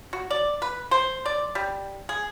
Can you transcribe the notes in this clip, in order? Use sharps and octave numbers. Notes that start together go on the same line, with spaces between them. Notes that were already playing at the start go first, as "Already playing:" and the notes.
F#4
D5
B4
C5
D5
G3
G#4